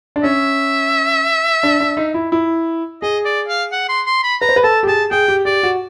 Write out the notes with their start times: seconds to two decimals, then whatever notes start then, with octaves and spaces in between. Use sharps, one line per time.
0.16 D4
0.23 C#4 E5
1.63 D4
1.80 D4
1.97 D#4
2.14 E4
2.32 E4
3.02 G#4 D#5
3.25 D5
3.48 F5
3.72 F#5
3.89 C6
4.06 C6
4.23 B5
4.41 B4 A#5
4.49 C5
4.56 B4
4.64 A4 A5
4.83 G4
4.87 G#4 A5
5.11 G#4 G5
5.28 G4
5.45 G4 D5
5.63 F#4